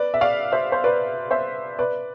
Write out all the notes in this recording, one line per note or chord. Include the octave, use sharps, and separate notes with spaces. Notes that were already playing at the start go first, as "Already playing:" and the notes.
Already playing: B4 D5
E5
D5 F5
C5 E5
C5
B4 D5
C5 E5
B4 D5